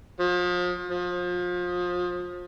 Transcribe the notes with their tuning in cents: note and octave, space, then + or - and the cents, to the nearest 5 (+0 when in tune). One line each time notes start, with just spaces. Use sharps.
F3 +35
F3 +30